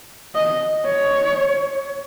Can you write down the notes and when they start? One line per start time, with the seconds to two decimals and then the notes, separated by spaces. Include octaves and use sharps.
0.35 D#5
0.86 C#5